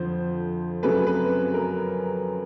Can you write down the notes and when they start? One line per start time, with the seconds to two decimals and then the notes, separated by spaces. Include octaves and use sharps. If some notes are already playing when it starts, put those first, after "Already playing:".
Already playing: F2 D3 F3 C5
0.83 F#2 C#3 F#3 A3 C4 B4
1.07 B4
1.54 A#4